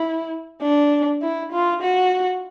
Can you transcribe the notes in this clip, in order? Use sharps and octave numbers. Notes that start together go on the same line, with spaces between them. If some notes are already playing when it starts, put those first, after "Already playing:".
Already playing: E4
D4
E4
F4
F#4